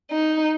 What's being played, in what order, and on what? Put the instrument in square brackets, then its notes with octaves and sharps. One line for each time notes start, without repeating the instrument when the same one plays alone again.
[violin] D#4